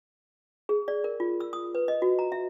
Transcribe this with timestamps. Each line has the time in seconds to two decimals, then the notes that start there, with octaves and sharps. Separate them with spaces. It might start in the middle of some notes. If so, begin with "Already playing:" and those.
0.69 G#4
0.88 D5
1.04 A#4
1.20 F4
1.40 E6
1.53 D#6
1.75 B4
1.88 D#5
2.02 F#4
2.19 A#5
2.32 E5